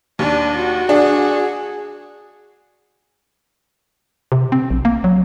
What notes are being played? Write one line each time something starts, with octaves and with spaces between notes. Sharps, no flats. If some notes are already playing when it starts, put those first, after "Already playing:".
D#2 D4
F#4
D4 G#4
C3
C4
A#1
A#3
F#3